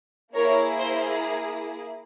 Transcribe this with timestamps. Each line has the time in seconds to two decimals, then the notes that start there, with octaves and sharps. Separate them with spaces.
0.34 A#3 E4 G#4 A#4 C#5
0.78 C5